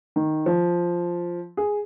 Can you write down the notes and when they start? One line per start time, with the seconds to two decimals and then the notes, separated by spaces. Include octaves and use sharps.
0.16 D#3
0.46 F3
1.57 G#4